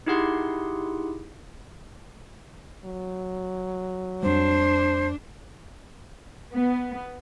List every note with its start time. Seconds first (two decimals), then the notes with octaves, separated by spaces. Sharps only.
0.06 D#4 E4 G4 G#4 F#5 C6
2.85 F#3
4.23 F2 G3 D4 C5
6.53 B3